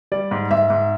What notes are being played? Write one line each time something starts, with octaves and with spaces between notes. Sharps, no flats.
G3 D5
G#2
G#2 E5
G#2